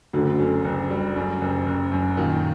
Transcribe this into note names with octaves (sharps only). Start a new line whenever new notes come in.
F#1 D2 D3
F#2
F#1
G3
F#2
F#1
F#1
F#2
A#2 D#3 A#3